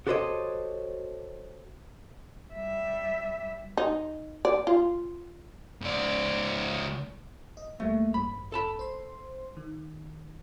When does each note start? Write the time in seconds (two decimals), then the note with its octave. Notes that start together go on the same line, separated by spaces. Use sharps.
0.07 F#4 G4 A4 C5 C#5 D#5
2.54 G3 E5
3.77 D#4
4.45 D5
4.67 F4
5.81 C#2 D5
7.57 D#5
7.80 D2 G3 A3 A#3
8.14 A1 G2 B5
8.52 A4 A5 B5
8.79 C5 C6
9.57 D#3